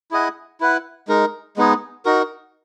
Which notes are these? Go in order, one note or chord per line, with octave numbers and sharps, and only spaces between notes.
E4 G#4 D#5 F#5
E4 B4 F#5
G#3 D#4 A#4
G#3 B3 D#4 G#4
D#4 F#4 A#4